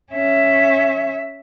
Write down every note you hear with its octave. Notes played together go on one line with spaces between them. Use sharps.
C#4 E5